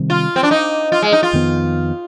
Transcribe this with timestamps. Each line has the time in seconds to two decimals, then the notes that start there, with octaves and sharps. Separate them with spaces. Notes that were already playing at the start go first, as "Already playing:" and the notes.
Already playing: C3 D#3 G3 C4
0.10 F4
0.36 C4
0.43 D4
0.51 D#4
0.92 F4
1.02 G#3
1.12 D#4
1.23 F4
1.33 F2 D#3 B3